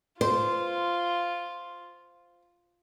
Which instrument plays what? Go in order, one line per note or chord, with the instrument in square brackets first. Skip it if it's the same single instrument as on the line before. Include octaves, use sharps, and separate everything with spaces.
[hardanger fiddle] F4 [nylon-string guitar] C5